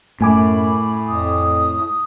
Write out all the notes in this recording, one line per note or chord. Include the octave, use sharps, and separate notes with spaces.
F#2 A2 A3 G#5 B5 D6
F2 D#6